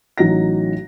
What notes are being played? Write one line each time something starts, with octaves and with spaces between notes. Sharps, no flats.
A1 F#3 D#4 A#6